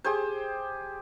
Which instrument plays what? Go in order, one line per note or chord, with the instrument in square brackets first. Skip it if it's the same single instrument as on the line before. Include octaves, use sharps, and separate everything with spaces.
[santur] G4 G#4 C5